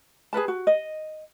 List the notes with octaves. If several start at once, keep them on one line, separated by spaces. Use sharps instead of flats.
G#4 A4 B4 A5
F#4
D#5